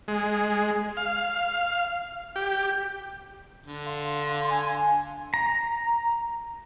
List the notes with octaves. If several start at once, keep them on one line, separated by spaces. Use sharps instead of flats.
G#3
F5
G4
D3
F5 C6
G#5
A#5